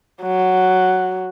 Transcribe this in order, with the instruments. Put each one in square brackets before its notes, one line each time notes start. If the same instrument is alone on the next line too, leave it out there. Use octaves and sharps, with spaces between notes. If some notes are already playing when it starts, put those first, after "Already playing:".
[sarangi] F#3